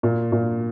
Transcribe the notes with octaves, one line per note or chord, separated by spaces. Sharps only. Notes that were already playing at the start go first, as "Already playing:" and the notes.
A#2
A#2